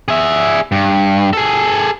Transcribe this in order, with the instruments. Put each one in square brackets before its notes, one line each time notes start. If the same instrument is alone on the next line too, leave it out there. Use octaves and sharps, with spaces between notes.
[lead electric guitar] G#4 E5
G2
G#4 A4